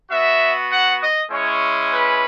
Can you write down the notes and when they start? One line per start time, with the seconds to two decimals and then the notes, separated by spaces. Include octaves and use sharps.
0.10 B3 F#4 E5
0.71 F#5
1.01 D#5
1.31 G#3 C#4 E4 C#5
1.91 B4